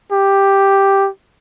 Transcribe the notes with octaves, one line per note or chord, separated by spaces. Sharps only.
G4